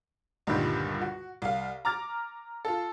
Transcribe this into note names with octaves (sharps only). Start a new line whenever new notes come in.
C#2 G2 A#2 D3 D#3 G3
F#4
C2 F5
A#5 D6 F6 A6
F4 A4